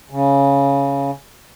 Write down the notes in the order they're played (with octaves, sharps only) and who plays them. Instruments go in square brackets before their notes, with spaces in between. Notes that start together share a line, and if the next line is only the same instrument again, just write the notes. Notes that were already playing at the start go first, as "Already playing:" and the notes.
[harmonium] C#3